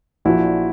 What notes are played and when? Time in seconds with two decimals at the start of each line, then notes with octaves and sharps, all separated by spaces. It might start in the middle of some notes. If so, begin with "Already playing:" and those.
0.25 A#1 A#2 F3 E4 F#4